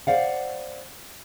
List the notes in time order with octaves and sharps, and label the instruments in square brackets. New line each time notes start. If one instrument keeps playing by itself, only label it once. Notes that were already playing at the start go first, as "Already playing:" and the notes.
[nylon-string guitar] C5 D5 F5 F#5